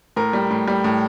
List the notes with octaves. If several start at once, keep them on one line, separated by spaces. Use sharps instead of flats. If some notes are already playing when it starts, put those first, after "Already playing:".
A2 A#4
G3
A2
G3
A2